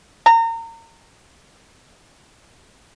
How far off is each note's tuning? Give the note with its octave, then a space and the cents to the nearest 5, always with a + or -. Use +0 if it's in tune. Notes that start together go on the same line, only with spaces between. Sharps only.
A#5 -30